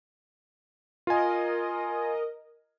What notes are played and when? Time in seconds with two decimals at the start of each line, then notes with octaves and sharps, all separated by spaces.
1.07 F4 A#4 D#5 G#5